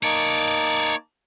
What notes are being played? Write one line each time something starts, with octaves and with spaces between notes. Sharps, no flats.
A#3 D#4 C#5 D5 A5